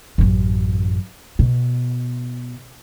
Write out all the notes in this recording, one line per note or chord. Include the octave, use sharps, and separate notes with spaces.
A1 F#2
B2